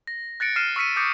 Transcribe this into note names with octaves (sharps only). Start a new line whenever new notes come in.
A#6
F#6 A6 A#6 C#7 D7
F6 C7 D#7 E7
C#6 E6 F6 B6 C#7 D#7
D6 D#6 G6 A6 A#6 C#7